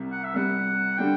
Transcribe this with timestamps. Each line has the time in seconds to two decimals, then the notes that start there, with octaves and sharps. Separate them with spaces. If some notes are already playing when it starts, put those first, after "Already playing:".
Already playing: C2 C3 G3
0.12 F#5
0.24 E5
0.33 C2 C3 G3 F#5
0.98 D3 G3 D4 F#4 G5